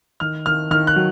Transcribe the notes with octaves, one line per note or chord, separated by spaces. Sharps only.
D#3 F6
D#3 F6
D#3 F6
F#6
F#3